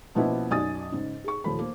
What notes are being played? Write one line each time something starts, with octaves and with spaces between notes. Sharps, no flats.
B2 F3 A#3 B3 C#4 E4
B1 F#2 D5 G#5 D#6 A6
G#2 C#3
G#4 C#6
D#1 F3 A4 B5
A#3 C5